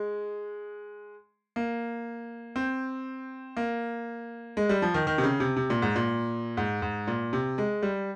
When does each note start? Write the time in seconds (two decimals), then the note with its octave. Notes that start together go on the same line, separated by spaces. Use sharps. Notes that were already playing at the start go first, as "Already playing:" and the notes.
Already playing: G#3
1.56 A#3
2.56 C4
3.57 A#3
4.57 G#3
4.69 G3
4.82 F3
4.94 D#3
5.07 D#3
5.18 C3
5.23 C#3
5.40 C3
5.56 C3
5.70 A#2
5.82 G#2
5.96 A#2
6.57 G#2
6.82 G#2
7.07 A#2
7.33 C3
7.58 G#3
7.83 G3